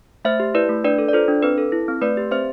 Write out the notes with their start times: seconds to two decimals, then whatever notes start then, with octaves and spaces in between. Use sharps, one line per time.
0.25 A3 C5 E5
0.40 G4
0.54 E4 B4 D5
0.69 A3
0.84 D4 B4 D5
0.98 A4
1.09 D5
1.13 F4 A4 C5
1.28 D4
1.43 C4 B4
1.58 A4
1.72 E4
1.88 C4
2.02 A3 B4 D5
2.17 G4
2.31 C4 C5 E5